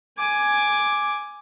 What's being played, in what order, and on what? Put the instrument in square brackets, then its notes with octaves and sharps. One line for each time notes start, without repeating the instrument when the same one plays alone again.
[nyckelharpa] G#5 D6